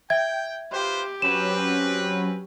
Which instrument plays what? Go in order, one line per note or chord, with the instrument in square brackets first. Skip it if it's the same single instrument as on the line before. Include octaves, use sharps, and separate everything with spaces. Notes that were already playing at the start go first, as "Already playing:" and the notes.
[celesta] E5 G#6 [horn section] G5
[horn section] F4 B4 C5 [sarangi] G4
[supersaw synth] F#3 C#4 [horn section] C4 B4 [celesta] E7